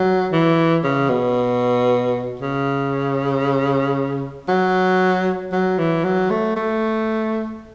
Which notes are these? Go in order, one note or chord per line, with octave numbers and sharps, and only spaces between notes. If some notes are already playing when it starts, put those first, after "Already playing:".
Already playing: F#3
E3
C#3
B2
C#3
F#3
F#3
E3
F#3
A3
A3